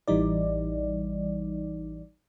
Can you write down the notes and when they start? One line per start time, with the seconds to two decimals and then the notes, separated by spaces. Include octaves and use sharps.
0.08 A1 E3 G3 D#4 D5